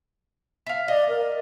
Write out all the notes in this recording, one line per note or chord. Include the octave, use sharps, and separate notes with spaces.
E5 F5
D5 D#5
A#4